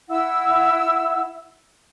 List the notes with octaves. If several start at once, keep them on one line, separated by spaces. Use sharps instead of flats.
E4 E5 F#5 E6